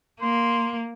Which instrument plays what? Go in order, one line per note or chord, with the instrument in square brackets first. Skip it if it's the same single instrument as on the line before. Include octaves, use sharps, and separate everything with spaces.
[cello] A#3 [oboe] C6